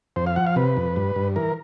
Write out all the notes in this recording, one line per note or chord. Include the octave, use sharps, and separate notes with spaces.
F2 C5
F5
F3 F#5
F5
C3 B4
F2
G2
G2
E3 A#4